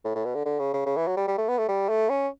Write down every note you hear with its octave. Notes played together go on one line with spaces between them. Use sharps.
A2
A2
B2
D3
D3
C#3
C#3
C#3
E3
F#3
G3
G3
A3
B3
A3
G3
A3
C#4